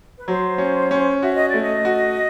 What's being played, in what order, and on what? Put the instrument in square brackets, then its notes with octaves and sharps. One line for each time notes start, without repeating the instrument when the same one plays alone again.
[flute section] B4
[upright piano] F#3 [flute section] C5
[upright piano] C#4
C#4
[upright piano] F#4 [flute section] E5
[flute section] D#5
D5
[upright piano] A3
[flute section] D#5
[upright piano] F#4